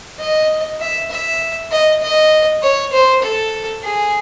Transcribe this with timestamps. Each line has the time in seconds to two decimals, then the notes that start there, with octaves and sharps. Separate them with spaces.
0.20 D#5
0.81 E5
1.11 E5
1.71 D#5
2.02 D#5
2.63 C#5
2.93 C5
3.23 A4
3.83 G#4